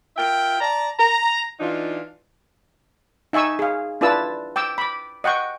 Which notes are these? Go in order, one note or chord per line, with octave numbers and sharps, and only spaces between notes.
F4 A#4 E5 G5
D5 A5 A#5
A#5
E3 D4 D#4 F4
D#4 E5 G#5 C#6 E6
G#4 F5
D4 E4 F4 B4 A5 E6
G5 D6 E6
B5 D6
D#5 F#5 G5 C#6